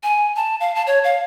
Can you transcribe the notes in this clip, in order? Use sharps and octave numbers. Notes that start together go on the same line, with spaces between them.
G#5
A5
F5
A5
C#5
F5